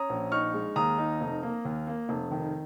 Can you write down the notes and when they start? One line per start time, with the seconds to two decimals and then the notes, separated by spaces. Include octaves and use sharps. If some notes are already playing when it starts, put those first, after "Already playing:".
Already playing: C#4 A#5 D#6
0.09 A#1
0.32 D#4 C#6 F6
0.54 G#3
0.76 D#2 A#5 D#6
0.98 D#4
1.21 F1
1.43 A#3
1.65 D#2
1.87 A#3
2.09 F1
2.31 D#3